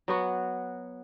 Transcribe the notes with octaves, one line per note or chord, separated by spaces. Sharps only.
F#3 B3 F#4